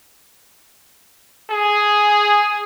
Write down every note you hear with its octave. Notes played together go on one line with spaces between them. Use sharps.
G#4